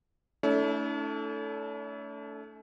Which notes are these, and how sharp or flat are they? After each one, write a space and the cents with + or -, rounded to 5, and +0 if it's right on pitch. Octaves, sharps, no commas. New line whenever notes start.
A3 +0 C#4 +45 E4 -40